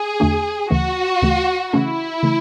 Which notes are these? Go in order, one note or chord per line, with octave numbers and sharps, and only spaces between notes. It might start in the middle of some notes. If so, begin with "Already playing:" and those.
Already playing: G#4
E2 D3 A3 D4 F#4
D2 C#3 E3 A3 F#4
D2 C#3 E3 A3
C#3 E3 A3 C#4 E4 G#4
C#3 E3 A3